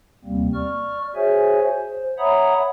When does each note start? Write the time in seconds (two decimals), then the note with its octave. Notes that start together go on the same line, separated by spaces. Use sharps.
0.25 D#2 C3 G3 A#3 C4
0.54 D5 C#6 F6
1.15 F#4 G#4 C5 C#5 E5 G#5
1.71 C5
2.18 C#5 E5 F#5 A#5 B5 D#6